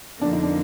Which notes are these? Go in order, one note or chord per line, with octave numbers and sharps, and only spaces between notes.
F2 D3 F3 A#3 D4
D#4
D4